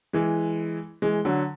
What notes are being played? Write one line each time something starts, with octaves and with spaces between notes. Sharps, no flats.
E3 G#3
E3 G#3
D3 F#3